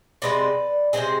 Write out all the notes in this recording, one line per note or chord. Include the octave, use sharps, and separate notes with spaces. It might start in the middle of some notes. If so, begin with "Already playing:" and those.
C3 F3 G#3 C4 B4 D5
C3 F3 G#3 C4 G#4 C5